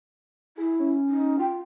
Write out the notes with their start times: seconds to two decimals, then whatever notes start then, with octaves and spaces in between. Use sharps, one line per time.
0.57 E4 G#4
0.79 C#4
1.09 D#4
1.39 F4 G5